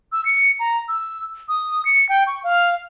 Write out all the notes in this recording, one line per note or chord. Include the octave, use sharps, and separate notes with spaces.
E6
C#7
A#5
E6
D#6
C#7
G5
C#6
F5